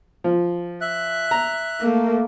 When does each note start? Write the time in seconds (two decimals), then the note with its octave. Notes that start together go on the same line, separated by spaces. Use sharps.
0.24 F3
0.81 E5 F#6
1.31 A#5
1.80 A3 A#3